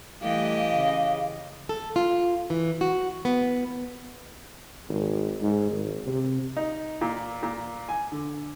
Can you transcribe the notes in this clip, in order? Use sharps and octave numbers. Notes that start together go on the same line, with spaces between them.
E3 G3 A3 G4 D#5 F5
C#3
A4
F4
E3
F#4
B3
G#1
G#2
G#1
C3
D#4
A#2
A#2
G#5
D3